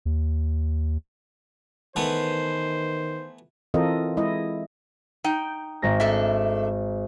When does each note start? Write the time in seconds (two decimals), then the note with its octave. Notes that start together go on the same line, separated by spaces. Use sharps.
0.06 D#2
1.96 D#3 E3 A3 B3 C5
3.74 E3 C4 F4 A4 A#4 D#5
4.17 G#3 E4 D#5
5.24 D#4 G5
5.82 G#1 A#4 A#6
6.00 A3 D4 E5